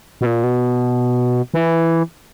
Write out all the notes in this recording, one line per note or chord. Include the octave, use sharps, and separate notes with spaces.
B2
A#2
B2
E3